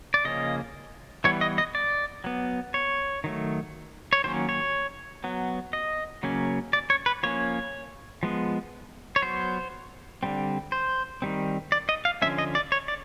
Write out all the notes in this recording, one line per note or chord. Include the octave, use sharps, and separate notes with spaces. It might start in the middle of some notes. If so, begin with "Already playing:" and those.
D5
C#3 F3 A#3 C#4 D#5
E3 G3 B3 C#5
D#5
D#5
D5
F#3 B3
C#5
D#3 F#3 A3
C#5
D#3 F#3 A#3 C#4 C5
C#5
F#3 B3
D#5
C#3 F#3 A#3 C#4
D5
C#5
B4
F3 A#3 C#4 C#5
F3 G#3 B3
C#5
F#3 B3 C5
D3 G3 C4
C5
D#3 G3 C4
D5
D#5
F5
D3 F3 A3 C#4 E5
D#5
D5
C#5
D5